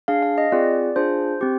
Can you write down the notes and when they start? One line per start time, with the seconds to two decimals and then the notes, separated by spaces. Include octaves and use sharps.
0.08 D4 G#4 F5
0.23 F5
0.38 D#5
0.52 C4 F4 G#4 D5
0.96 D4 F4 G#4 C5
1.41 C4 G4